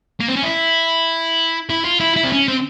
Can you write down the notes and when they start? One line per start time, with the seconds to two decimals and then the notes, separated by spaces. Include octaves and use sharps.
0.20 A#3
0.28 C4
0.36 C#4
0.43 E4
1.69 E4
1.85 F4
2.00 E4
2.16 E4
2.24 C4
2.32 C#4
2.48 C4